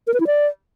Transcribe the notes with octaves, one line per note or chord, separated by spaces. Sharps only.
A#4
B4
E4
D5